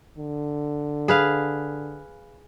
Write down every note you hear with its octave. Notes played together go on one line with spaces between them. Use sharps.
D3
G#4 B4 F5